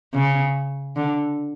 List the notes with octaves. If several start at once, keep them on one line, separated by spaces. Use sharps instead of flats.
C#3
D3